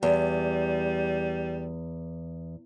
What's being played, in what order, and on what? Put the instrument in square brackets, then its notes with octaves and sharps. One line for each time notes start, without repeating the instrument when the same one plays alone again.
[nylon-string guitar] E2 [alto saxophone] G3